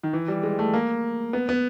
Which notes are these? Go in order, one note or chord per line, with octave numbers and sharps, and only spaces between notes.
D#3
E3
G3
G#3
A3
A#3
B3
B3